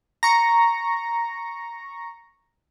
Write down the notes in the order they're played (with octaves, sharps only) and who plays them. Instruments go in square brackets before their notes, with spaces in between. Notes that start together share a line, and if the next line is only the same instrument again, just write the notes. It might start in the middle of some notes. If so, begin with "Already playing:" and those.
[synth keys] A#5 C#6